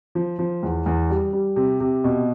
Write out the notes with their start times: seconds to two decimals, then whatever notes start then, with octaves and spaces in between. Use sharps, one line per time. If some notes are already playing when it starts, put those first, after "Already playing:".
0.15 F3
0.39 F3
0.63 E2
0.86 E2
1.10 G3
1.33 G3
1.56 C3
1.80 C3
2.04 B2